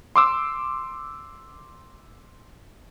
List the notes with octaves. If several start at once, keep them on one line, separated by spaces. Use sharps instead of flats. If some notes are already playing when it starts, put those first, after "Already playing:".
C6 D6 E6